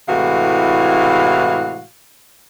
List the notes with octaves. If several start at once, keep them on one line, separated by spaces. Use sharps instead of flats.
A2 C3 E3 G#3 F#4 F5